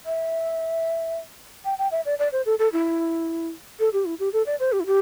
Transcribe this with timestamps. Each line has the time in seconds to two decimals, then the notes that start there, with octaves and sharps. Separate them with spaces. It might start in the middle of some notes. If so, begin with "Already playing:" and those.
0.06 E5
1.65 G5
1.78 G5
1.91 E5
2.05 D5
2.19 D5
2.32 C5
2.46 A4
2.59 A4
2.73 E4
3.80 A4
3.93 G4
4.05 E4
4.19 G4
4.33 A4
4.46 D5
4.60 C5
4.72 G4
4.80 E4
4.86 G4